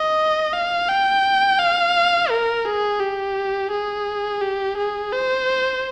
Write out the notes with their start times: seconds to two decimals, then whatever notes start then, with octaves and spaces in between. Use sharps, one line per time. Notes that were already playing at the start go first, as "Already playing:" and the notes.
Already playing: D#5
0.53 F5
0.89 G5
1.59 F5
2.30 A#4
2.66 G#4
3.00 G4
3.71 G#4
4.41 G4
4.77 G#4
5.12 C5